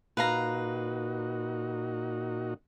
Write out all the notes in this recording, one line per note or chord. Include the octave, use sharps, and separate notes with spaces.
A#2 D#4 F#4 B4 F5 A#5